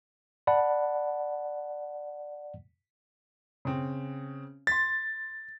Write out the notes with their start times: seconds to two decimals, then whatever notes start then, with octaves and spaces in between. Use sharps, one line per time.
0.47 D5 F#5 A5 B5
3.65 C#3 C4
4.67 C6 A6 B6